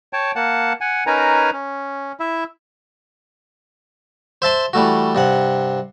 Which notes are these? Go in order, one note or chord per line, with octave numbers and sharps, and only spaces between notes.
C#5 G5 A5
A#3 F#5 A5
F#5 G#5
C#4 D#4 A#4 B4 G#5 A#5
C#4
E4 E5
C5 E5 A5 C6
E3 G3 A3 F#4
G2 C3 F#5